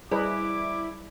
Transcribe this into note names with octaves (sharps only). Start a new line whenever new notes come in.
G3 E4 G#4 B4 D5 D#5 D6